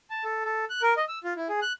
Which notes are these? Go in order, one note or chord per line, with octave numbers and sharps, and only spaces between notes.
A5
A4
A4
F#6
A#4
D#5
E6
F4
E4
G#4
F#6